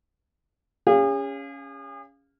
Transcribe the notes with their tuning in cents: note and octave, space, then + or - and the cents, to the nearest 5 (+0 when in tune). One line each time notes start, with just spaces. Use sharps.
C#4 +10 G#4 -40 F5 +0